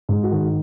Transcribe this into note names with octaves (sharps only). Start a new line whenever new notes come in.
G#2
F#4
D#3